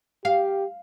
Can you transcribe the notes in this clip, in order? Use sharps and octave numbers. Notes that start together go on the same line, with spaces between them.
G4 F5